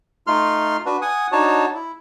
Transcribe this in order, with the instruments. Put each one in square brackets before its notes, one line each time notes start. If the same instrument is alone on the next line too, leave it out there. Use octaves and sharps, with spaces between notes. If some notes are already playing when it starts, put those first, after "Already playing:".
[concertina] A3 D#4 F4 C6 F6
D4 F#4 B4
F#5 G#5 D#6
D4 D#4 F#4 C#5 A5
E4